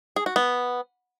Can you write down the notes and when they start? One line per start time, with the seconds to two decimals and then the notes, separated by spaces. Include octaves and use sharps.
0.16 G#4
0.26 F#4
0.36 B3